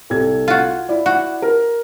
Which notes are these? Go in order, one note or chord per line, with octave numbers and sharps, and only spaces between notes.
C2 A4 G#6
F4 F#4
E4 D5
F#4
A#4